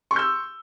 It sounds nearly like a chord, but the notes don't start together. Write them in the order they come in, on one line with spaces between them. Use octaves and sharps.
C#6 C6 G6 E6